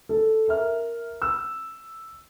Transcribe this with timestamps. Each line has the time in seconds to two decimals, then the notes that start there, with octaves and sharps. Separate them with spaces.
0.09 A4
0.48 A#4 E5 F6
1.22 E6